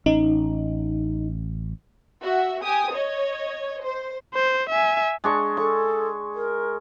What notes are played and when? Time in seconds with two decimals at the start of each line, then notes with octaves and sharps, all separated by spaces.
0.06 A1 C#4 D#4
2.22 F#4 E5
2.62 G4 G#5 D#6
2.94 C#5 D#5
3.84 C5
4.34 C5
4.70 E5 G#5
5.24 G#3 D4 C#6
5.57 A4 C#6
6.35 A#4